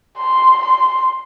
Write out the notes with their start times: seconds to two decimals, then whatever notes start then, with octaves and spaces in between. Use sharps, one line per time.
0.18 C6
0.63 C6